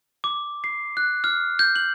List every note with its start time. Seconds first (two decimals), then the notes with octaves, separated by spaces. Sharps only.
0.24 D6
0.64 C7
0.97 F#6
1.24 F6
1.59 G6
1.76 F#7